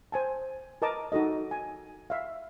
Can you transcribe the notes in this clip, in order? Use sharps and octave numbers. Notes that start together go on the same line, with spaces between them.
C5 G#5 A5
A#4 B4 D#5 A5 A#5 D6
D#4 F#4 A4 D#5
G#5
E5 F5